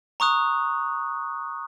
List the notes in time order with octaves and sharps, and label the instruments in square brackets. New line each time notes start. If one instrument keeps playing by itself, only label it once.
[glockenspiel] A#5 C#6 D#6 F#6